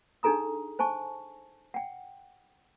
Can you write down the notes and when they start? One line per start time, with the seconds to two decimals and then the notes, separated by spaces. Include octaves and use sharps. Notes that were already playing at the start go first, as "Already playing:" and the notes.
0.23 D4 D#4 G#4 A4 A#5 D#6
0.79 C5 G#5 A5 C#6
1.74 F#5 G5